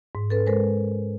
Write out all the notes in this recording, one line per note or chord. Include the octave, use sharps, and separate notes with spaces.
G#2
C#4 A4 B4
G#3 A#4 C5